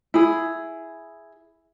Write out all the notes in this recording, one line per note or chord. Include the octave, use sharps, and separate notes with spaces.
E4 G#4